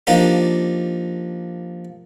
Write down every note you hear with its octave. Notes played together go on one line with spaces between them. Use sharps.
F3 A#3 D4 D#4 G4